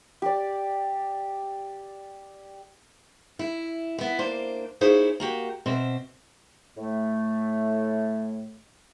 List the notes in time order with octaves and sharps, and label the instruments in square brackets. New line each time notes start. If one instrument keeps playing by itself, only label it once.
[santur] G4 D5
[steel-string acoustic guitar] E4
B3 E4
A#3 D4 C5
A#3 D#4 E4 G#4 C5 C#5
A#3 F#4 G4
B2 C4 C5 E5
[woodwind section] A2 A3